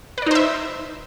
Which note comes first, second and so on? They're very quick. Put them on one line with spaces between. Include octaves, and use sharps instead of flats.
B4 D5 D#4 C5 E5